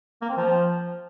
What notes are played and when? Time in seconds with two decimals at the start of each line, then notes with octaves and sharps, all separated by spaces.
0.22 A#3
0.29 C4
0.37 F3